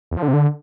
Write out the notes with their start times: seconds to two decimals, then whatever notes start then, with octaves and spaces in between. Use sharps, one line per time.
0.11 E2
0.17 F3
0.22 D3
0.28 C3
0.33 D3